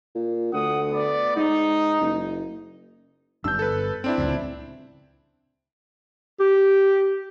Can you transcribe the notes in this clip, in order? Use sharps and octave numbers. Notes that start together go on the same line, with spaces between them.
A#2
D2 F#5 D#6
B3 D5
G#2 D#4
F#1
G1 G2 D4 E6 G6
A4 B4
C4 D4 E4
D1 G#1 C#2
G4